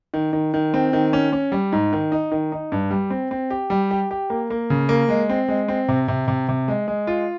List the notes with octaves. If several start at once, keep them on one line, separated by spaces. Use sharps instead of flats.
D#3
D#3
D#3
C4
D#3
C#4
C#4
G3
G#2
D#3
D#4
D#3
D#4
G2
G3
C4
C4
G4
G3
G4
G4
A#3
A#3
C#3
A#3
G#3
C4
G#3
C4
C3
C3
C3
C3
G#3
G#3
F4